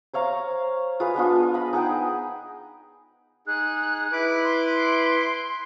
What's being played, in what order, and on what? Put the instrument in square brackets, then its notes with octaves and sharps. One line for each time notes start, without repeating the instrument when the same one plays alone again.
[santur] C5 C#5 F5 A#5
F4 G#4 B4
G#3 B3 D4 F4
D#5 B5
D#4 G#4 F#5 G5
[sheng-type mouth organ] D#4 G#4 [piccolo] F#6
[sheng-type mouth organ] E4 B4 D6
[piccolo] C6